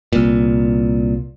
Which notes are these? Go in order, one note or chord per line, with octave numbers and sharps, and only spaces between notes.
C2 A#2